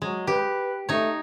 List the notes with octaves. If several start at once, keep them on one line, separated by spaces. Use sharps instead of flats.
F#3 G#3
G4 B4
A3 D#4 C#5